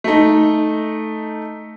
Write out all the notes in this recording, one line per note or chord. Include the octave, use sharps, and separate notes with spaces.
A3 D#4